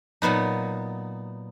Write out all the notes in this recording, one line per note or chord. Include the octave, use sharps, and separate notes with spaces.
A#2 F#3 B3 D#4